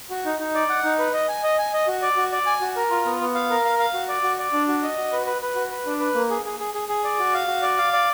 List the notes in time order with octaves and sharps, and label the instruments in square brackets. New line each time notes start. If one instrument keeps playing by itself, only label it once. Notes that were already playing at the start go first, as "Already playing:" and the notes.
[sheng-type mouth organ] F#4
D#4
D#4
D5
F#5
D#4
B4
D#5
G#5
D#5
G#5
D#5
F#4
D5
F#4
D5
G#5
F#4
A#4
F4
B3
B3
F5
A#4
F5
F5
F#4
D5
F#4
D5
D4
F#4
D#5
F#4
B4
B4
B4
F#4
B4
D4
B4
A#3
G#4
G#4
G#4
G#4
G#4
D5
F#4
F5
F#4
D5
F5
D5